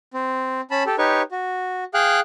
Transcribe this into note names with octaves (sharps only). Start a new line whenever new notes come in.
C4
C#4 A5 B5
G4 A4
D#4 G4 B4 C#5 C#6
F#4
G#4 F5 G5 F#6